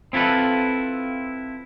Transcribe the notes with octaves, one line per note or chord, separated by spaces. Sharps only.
C4 E4 F4 A4 B4